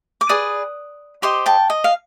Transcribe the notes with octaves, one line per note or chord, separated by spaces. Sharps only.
D6
G#4 B4 D5 D#6
G4 C5 D#5 C6 D6
G5 A5
D#5
F5